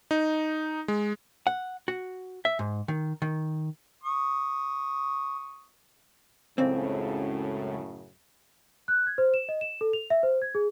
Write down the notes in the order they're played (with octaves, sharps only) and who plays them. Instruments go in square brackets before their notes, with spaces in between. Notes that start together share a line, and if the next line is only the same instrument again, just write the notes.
[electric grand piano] D#4
G#3
[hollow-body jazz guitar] F#5
F#4
E5
G#2
D#3
D#3
[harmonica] C#6 D#6
[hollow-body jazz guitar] C#2 C4 [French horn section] F#2 A2 C#3
[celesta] F#6
G#6
C5
E7
D#5
E7
A4
F7
E5
C5
G#6
G#4